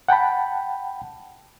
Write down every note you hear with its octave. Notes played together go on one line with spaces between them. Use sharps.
F#5 G5 A5 B5